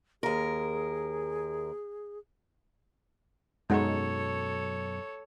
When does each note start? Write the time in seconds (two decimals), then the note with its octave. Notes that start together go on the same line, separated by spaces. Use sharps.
0.23 D#2 G#4 A#4
3.70 F#2 B2 F#3 G#3 D#4 A4 C#5 F#5